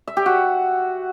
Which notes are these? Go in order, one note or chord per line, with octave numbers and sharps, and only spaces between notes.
E5
G4
F#4